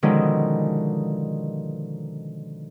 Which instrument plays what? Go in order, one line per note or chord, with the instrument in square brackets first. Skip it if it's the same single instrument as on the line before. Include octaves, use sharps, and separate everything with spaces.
[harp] B2 D3 D#3 F3 G#3 C#4